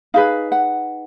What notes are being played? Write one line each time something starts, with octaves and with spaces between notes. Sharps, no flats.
D#4 G#4 B4 F5
F#5